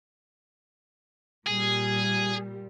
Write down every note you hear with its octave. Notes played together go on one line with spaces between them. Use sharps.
A#2 G3 G#4